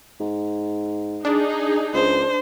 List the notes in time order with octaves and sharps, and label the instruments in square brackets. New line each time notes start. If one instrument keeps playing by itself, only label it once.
[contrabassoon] G#2
[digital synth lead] D4 [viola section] D#4 G#4
[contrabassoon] C#2 [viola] C5